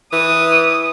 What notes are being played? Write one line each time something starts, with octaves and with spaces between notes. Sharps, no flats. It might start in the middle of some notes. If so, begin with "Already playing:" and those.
E3 D#6